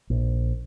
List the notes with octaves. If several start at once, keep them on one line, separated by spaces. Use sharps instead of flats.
A#1